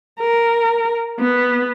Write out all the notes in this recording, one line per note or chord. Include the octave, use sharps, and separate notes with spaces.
A#4
B3